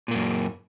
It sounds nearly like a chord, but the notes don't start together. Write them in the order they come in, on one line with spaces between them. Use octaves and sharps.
A#2 A#3 F#2